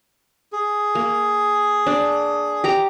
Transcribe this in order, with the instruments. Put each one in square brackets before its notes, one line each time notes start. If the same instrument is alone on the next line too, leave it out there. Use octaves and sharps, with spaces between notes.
[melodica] G#4
[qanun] A#3
D4
G4 A#5